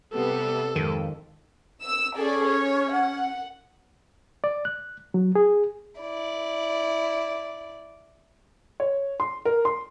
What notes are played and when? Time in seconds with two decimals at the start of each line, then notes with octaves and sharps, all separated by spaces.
0.13 C3 G3 B3 A4
0.76 F2 G#2 D#3
1.85 E6
2.16 C#4 G#4 A4 D5
2.49 C#5
2.94 F#5
4.44 D5
4.65 F#6
5.14 F#3
5.35 G#4
6.01 E4 D5
8.80 C#5
9.20 C6
9.45 A#4
9.65 C6